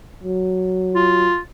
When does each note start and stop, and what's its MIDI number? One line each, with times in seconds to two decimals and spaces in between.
0.23 1.30 54
0.96 1.40 65